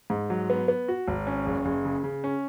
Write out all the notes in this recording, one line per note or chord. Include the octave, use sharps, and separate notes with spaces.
G#2
F#3
B3
B3
F#4
G#1
C#4
F#1
F#1
C#3
C#3
C#4